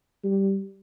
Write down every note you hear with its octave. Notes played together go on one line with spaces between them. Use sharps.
G3